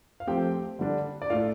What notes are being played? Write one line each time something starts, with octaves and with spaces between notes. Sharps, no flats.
F5
F3 A3 C4 G4 G5
D3 G3 D4
D5
A2 A3 D4 F4 F5